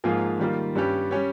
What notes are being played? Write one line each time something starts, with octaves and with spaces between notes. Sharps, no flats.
G#2 F3 A#3 F4 G#4
D#3 G3 A#3 F4
G2 G3 C#4 G4
G3 C#4 G4 C#5